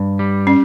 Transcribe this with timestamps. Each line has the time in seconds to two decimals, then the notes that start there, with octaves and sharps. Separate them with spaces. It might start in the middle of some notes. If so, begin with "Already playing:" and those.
Already playing: G2
0.19 G3
0.47 C#4